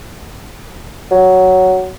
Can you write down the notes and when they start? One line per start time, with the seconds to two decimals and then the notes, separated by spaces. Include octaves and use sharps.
1.11 F#3